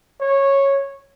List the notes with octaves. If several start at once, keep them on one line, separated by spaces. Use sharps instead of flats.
C#5